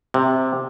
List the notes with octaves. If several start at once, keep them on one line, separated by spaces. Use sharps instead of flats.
C3